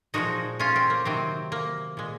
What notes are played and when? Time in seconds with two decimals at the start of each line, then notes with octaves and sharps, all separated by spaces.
0.14 A#2 F3 G#3 D#4 F#4
0.60 C#4 F4
0.76 C4
0.90 A#3
1.05 C3 D#3 F#3 C4
1.52 A#3
1.97 A#2 G#3